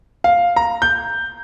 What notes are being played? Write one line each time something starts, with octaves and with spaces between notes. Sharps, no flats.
F5
A#5
G6